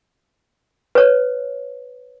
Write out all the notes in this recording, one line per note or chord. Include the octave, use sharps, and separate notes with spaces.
B4 C#5